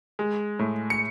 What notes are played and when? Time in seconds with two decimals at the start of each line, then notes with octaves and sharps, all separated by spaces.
0.19 G#3
0.59 A2
0.90 C#7